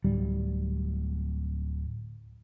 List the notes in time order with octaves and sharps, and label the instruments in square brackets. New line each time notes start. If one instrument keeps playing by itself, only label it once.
[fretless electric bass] D1 G3